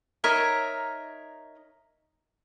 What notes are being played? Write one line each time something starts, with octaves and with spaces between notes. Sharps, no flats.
D#4 A#4 C#5 E5